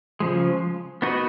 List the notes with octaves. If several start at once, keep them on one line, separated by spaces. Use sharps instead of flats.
C#3 F3 G#3
B3 D#4 F#4 B4